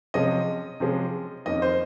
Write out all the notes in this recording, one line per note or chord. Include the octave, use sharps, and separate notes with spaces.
C3 F3 G#3 C#4 D#5
C3 F3 G#3 C#4
F2 D#3 A#3 C#4 D#5
C5